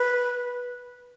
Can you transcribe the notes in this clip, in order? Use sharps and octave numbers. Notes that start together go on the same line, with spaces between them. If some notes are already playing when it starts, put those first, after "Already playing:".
Already playing: B4